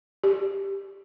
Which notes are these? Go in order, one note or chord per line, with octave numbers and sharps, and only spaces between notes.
G4